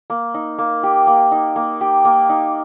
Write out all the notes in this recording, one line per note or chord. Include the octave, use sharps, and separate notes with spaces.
A#3
D#4
A#3
G4
A#3
D#4
A#3
G4
A#3
D#4